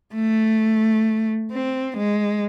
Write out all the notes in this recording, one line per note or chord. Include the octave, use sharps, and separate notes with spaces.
A3
C4
G#3